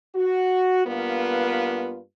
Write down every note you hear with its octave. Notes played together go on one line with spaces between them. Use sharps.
F#4
G2 A#3 B3 F4 B4